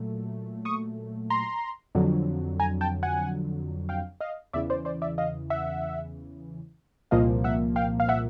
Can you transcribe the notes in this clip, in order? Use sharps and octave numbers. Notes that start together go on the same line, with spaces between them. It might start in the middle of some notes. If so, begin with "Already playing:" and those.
Already playing: A#2 F#3 A3
C#6 D#6
A#5 C6
F2 D3 F#3
G#5 A#5
G5 A5
F#5 G#5
F5 G5
D#5 F5
E2 C#3 E3 D5 E5
C5 D5
C5 D5
D5 E5
D#5 F5
E5 F#5
C2 A#2 F3 A#3 D#5 F5
E5 F#5
F5 G5
F5
E5 F#5